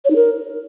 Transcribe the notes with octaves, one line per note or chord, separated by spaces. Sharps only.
C#5
D#4
A#4